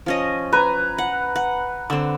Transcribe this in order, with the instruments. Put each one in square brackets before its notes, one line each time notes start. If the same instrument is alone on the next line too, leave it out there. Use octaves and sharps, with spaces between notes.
[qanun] F3 C#4 D#5
[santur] B4 A#5 [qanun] G#5
[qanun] F#5
F#5
[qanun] D3 C4 [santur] E6